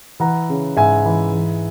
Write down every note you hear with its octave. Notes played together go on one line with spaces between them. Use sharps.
E3 F#5 A#5
C#3
G#2 E5 G#5
E3
E3